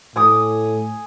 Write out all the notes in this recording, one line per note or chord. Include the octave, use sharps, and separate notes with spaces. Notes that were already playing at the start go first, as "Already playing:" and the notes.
A2 G#5 D6 D#6